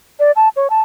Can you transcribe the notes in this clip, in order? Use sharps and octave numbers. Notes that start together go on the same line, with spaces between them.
D5
A5
C#5
A5